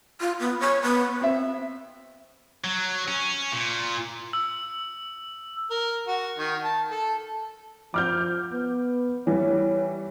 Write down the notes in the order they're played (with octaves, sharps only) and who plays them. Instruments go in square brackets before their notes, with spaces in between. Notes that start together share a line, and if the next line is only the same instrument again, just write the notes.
[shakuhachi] F4
B3
C#5
B3
[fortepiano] C4 E5
[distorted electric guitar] F#3
C#4
A#2
[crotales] E6
[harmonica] A#4
F#4
D#3
A5
A4
[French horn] F3 [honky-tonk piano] D6 F6 G6
[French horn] B3
[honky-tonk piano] E3 G3 [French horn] C#5